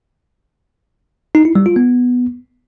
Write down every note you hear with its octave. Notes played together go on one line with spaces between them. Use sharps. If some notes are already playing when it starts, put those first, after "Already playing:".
D#4
E4
G3
F4
B3